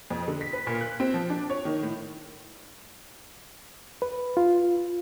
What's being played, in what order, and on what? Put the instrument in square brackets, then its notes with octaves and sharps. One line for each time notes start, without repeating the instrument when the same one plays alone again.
[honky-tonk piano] F2
D3
B6
B4
A#2
F#6
C4
F3
D4
C#5
D#3
A2
[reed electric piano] B4
F4